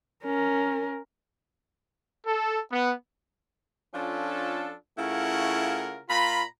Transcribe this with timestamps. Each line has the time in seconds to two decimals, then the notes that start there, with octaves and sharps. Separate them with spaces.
0.24 C#4 A#4
2.26 A4
2.71 B3
3.94 F3 C#4 D4 F4 A4
4.98 C#3 A3 E4 F4 A#4 F#5
6.09 A#2 F4 A#5 B5